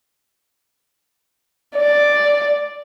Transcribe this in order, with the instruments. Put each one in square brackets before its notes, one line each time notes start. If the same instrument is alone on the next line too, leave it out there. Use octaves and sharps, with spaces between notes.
[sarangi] D5